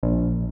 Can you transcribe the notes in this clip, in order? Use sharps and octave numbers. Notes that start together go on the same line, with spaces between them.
A#1